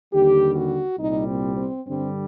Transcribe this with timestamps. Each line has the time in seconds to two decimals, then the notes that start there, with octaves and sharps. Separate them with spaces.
0.12 D#2 D3 G3 G4
0.56 F#4
0.99 C2 A#2 G3 D#4
1.27 C4
1.57 C4
1.84 G2 D3 G3 C4